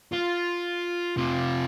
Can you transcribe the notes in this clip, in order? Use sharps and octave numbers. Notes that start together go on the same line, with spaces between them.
F4
C3 F4